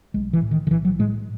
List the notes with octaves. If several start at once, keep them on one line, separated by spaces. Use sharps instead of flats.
B1 G#3
E3
A2
D#3
D#3
B1 E3
F#3
A2 G#3